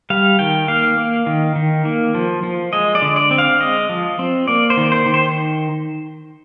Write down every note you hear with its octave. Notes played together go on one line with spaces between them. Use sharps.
G3 F5
D#3 G5
A#3 F5
A#3
D#3
D#3
A#3
F3
F3
G#3 D#5
D5
D3
D5
C4
F5
G#3 D#5
F3
C4
A#3 D5
C5
D#3
C5
D#3
C5